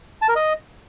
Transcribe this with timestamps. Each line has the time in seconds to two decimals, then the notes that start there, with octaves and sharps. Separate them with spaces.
0.22 A5
0.29 A#4
0.36 D#5